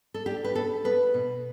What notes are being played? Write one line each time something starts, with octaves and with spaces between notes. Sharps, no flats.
A4
D4 G4
B4
B3 A4
B3 B4
B2